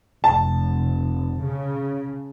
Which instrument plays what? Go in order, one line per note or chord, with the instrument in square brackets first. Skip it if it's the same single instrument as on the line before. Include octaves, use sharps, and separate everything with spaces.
[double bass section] F1 [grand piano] A5
[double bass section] C#3